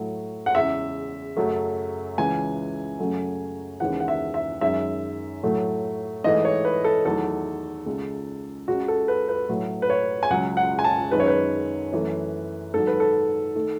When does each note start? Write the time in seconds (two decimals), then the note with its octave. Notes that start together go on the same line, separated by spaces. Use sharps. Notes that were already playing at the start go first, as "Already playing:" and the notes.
Already playing: A2 F#3 A3
0.46 F#5
0.55 E2 C#3 G#3 E5
1.37 F#2 C#3 F#3 A3
2.18 C#2 C#3 E3 G#5
2.99 F#2 C#3 F#3 A3
3.80 D#2 C#3 E3 G#3 F#5
4.00 F#5
4.08 E5
4.34 E5
4.61 F#2 D#3 G#3 E5
5.43 A2 F#3 A3
6.24 G#2 E3 A3 D#5
6.45 C#5
6.65 B4
6.84 A4
7.05 E2 D#3 F#3 A3 A4
7.86 C#2 C#3 G#3
8.68 C#2 C#3 G#3 F#4
8.88 A4
9.08 B4
9.29 B4
9.49 A2 F#3 A3
9.82 B4
9.90 C#5
10.23 G#5
10.30 C#2 C#3 F#3 F#5
10.57 F#5
10.79 G#5
10.84 A5
11.11 F#2 D#3 G#3 B4
11.20 C#5
11.28 B4
11.92 F#2 E3 A3
12.74 G#2 D#3 F#3 A4
12.87 B4
13.00 A4
13.55 D#3 A3